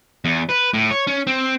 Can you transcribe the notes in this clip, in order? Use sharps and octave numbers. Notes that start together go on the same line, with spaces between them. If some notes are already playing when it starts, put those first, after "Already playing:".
E2
B4
A2
C#5
C#4
C4